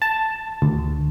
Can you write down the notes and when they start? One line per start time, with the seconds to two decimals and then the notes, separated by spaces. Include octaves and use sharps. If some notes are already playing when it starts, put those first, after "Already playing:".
0.02 A5
0.62 D2